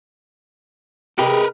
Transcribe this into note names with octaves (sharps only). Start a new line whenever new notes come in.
C3 G#3 G4 G#4 A#4 B4